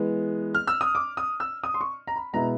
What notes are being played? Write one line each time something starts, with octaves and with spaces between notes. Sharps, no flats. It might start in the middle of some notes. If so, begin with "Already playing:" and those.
Already playing: E3 G#3 B3
F6
E6
D#6
D6
D#6
E6
D#6
C6
C#6
A#5
B5
B2 G#3 B3 E4 A#5